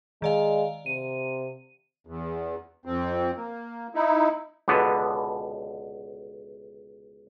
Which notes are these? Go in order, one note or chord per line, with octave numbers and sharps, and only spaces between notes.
D#3 G#3 D5 F5
C3 D#7
E2
F2 C4
A#3
D#4 E4
C#2 B2 D3 B3